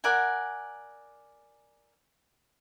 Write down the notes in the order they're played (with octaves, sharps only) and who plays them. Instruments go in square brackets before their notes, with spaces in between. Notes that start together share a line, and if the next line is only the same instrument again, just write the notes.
[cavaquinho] A#4 D5 F#5 G#5